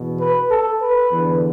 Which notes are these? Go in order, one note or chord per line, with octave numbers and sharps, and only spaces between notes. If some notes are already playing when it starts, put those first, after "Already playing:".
Already playing: E2 B2
B4
A4
B4
E2 D3